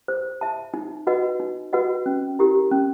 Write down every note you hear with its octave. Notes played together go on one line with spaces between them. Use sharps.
C5
E5 A5
D#4
F#4 B4 D#5 F#5
D#4
F#4 B4 D#5 F#5
C#4
E4 G4 A#4
C#4